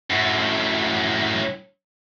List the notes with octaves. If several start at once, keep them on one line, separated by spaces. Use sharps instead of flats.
F#2 A2